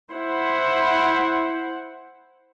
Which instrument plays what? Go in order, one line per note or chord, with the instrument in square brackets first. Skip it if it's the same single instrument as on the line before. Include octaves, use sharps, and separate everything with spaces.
[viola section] E4 C5 F#5